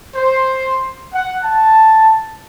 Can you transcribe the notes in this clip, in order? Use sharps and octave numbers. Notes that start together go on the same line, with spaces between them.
C5
F#5
A5